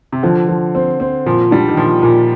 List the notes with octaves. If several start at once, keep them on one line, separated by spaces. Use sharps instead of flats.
C3
D3 F3
F3
C4
C4
A#2 F3
G3 D4
D#3
A#2 F3
A#2